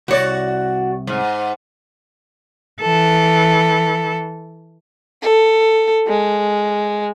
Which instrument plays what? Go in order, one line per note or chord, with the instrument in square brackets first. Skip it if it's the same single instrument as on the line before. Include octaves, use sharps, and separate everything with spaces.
[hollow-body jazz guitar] C2 C#5 [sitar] F#4 D5
[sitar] G#2
[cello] E3 A4
[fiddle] A4
G#3